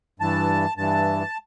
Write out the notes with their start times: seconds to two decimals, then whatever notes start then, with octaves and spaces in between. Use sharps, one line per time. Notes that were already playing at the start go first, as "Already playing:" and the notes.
0.20 G2 E3 A5
0.77 G2 E3 A5